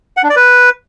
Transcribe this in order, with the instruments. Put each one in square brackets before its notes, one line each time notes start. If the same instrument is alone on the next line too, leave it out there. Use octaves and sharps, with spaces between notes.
[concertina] F#5
D4
D5
B4